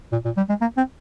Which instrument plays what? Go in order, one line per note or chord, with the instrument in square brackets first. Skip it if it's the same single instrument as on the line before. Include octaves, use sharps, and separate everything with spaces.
[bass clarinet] A#2
A#2
G3
G#3
A#3
C4